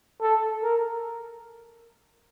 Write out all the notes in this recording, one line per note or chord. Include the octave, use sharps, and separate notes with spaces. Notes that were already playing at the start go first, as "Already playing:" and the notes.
A4
A#4